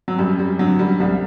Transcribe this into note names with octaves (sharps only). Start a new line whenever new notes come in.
F#3
F#2 G3
G3
D3 F#3
G3
C2 G3